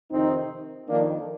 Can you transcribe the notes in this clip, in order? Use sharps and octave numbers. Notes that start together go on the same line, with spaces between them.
F2 C3 D#3 C4 D#4
F2 D#3 A#3 D4